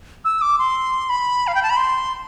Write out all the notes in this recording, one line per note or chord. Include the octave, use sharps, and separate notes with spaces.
E6
D6
C6
B5
F5
G5
A5
B5
C6